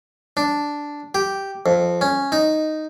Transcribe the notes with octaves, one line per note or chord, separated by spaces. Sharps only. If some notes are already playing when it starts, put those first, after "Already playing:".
D4
G4
F2
C#4
D#4